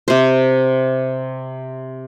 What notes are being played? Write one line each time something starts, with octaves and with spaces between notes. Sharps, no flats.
C3 C5